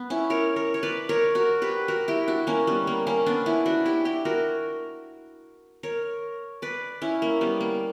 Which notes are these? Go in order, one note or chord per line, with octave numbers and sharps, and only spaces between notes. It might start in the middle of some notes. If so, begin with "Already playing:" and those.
Already playing: B3
C#4 E4
A#4 C#5
A#4 C#5
C#5
B4 D5
A#4 C#5
F#4 A#4
G4 B4
F#4 A#4
E4 G4
D4 F#4
A#3 C#4
G3 B3
A#3
A#3 C#4
B3 D4
C#4 E4
D4 F#4
E4 G4
E4 G4
F#4 A#4
A#4 C#5
B4 D5
C#4 E4
A#3
G3 B3
A#3